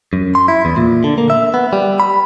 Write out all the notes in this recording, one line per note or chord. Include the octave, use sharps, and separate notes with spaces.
F#2
C6
E4
E2
A#2
D3
A#3
E5
B3
G3
B5